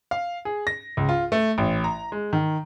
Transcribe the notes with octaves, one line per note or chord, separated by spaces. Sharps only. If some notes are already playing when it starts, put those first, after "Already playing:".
F5
G#4
A#6
C#2
F4
A3
A1
A#5
G#3
D#3